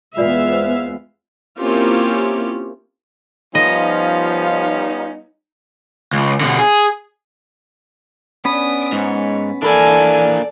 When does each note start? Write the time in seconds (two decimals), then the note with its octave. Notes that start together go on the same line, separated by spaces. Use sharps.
0.17 E2 G#3 B3 F4 G#4 D5 E5 F5
0.52 C5
1.59 A#3 C4 C#4 E4 F4 G4
3.55 F3 G3 B3 C#4 D#4 F4 D#5
6.13 C#2
6.41 B2 D3
6.59 G#4
8.45 B3 C#4 D4 B5 D#6
8.92 G#2 C#5
9.63 E3 A#3 D4 A4 D5 G#5 B5